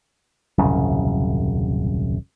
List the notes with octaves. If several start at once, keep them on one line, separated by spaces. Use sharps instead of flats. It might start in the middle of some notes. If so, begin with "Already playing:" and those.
D#1 C2 F#2 C#3